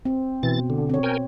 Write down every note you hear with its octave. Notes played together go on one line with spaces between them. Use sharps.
C4
B2 E3 A6
D3
C4 C#5
A#4 G5 G#5